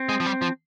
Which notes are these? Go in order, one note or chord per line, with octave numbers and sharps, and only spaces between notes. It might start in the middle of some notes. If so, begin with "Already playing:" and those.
Already playing: C4
G#3
F3
G3
F3